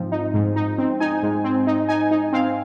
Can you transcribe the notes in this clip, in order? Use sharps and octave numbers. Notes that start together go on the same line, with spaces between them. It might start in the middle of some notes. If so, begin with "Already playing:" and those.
Already playing: G#2 F3 C4
D#4
G#2
D#4
C4
D#4 G#5
G#2
C4
D#4
D#4 G#5
D#4
C4 F5